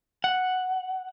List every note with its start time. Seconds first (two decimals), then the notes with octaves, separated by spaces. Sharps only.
0.24 F#5